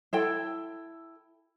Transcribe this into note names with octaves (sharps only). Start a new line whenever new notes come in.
E4 A4 G5